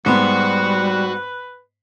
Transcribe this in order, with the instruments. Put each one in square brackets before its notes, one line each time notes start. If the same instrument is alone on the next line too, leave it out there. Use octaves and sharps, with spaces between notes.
[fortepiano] G#2 B3 [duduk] G3 [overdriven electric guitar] F#4 [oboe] B4